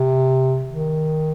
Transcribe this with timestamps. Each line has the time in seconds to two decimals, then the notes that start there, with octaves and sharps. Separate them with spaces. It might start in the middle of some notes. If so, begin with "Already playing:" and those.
Already playing: C3
0.69 D#3